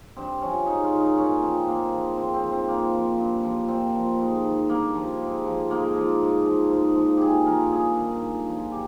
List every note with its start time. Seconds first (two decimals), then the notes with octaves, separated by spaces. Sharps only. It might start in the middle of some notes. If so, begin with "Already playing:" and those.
0.17 G2 C4
0.41 F3 C#4
0.66 G#2 D#4
0.84 F4
0.92 D#3
1.00 D#4
1.17 A#2 C#4
1.42 F3 C4
1.68 G#2 A#3
1.92 F3
2.17 G#2 C4
2.34 C4
2.43 F3
2.51 C4
2.68 A#2 A#3
2.94 F3
3.19 G2
3.43 F3
3.68 A#2 C4
3.94 F3
4.20 G#2
4.44 D#3
4.69 G2 A#3
4.95 F3
5.21 G#2
5.45 F3
5.70 G#2 A#3
5.95 F3
6.21 G#2
6.46 F3
6.70 G#2
6.96 F3
7.17 A#2 G4 G#4
7.46 F3 A#4
7.72 G2 G#4
7.97 D#3
8.22 A#2
8.47 F3
8.72 G4